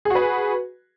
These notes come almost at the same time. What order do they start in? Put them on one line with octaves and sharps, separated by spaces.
G#4 F#4 B4